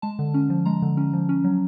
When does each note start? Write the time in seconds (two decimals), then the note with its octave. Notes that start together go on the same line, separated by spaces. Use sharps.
0.02 G#3 A5
0.19 D3
0.34 C#4
0.50 F3
0.65 G#3 A#5
0.82 D3
0.97 C#4
1.13 F3
1.29 C#4
1.44 F#3